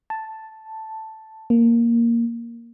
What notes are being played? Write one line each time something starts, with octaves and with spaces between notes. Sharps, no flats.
A5
A#3